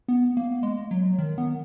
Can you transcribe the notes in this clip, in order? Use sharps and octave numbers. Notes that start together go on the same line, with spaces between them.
B3
A#3
G#3
F#3
D#3
B3